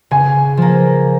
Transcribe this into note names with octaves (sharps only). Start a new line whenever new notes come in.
C#3 G#5
F3 A#3